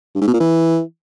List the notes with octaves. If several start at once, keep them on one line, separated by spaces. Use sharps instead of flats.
G2
G#2
B2
A#2
E3